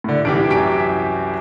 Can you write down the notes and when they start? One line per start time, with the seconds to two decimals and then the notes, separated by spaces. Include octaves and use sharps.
0.04 A2 D3
0.25 C2 E3 G4 D7
0.50 F#2 B6 D7